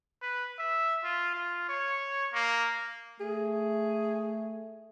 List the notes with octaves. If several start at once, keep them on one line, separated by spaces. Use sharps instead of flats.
B4
E5
F4
F4
C#5
A#3
A3 G#4